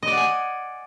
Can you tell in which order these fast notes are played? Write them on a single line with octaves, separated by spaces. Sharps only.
D#5 D5 F#5 G#5